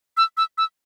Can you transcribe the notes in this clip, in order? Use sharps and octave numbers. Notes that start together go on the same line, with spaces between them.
E6
E6
E6